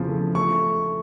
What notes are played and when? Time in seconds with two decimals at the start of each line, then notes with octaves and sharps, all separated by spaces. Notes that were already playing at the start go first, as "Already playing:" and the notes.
Already playing: E2 C#3 F3
0.08 A3
0.35 A3 C#6